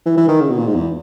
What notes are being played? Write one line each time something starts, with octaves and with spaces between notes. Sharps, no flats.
E3
E3
D#3
C#3
B2
A#2
G#2
E2